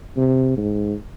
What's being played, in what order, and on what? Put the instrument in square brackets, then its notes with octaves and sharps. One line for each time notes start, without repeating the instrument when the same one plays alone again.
[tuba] C3
G#2